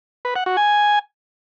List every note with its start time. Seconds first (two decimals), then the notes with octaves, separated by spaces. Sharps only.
0.25 B4
0.36 F#5
0.46 F#4
0.57 G#5